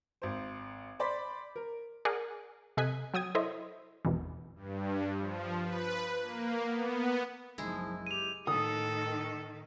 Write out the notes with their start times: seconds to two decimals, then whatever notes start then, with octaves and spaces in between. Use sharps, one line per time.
0.22 G#1 C5
0.99 C5 D5 B5 C6 B6
1.56 A#4
2.05 G#4 A#4 D5 F#5 G#5
2.77 C3 A4 D#5 G#5 F#6 B6
3.14 F#3 G5 D#6 G#6
3.35 E4 A4 C5 C#5 D#5 E5
4.05 G#1 E2 B2 E3
4.56 G2
5.18 F3
5.63 B4
6.22 A#3
6.64 B3
7.58 F#1 B1 F3 G#3 E4
8.07 G4 D#7 F7
8.47 A2 D#3 A4 D#6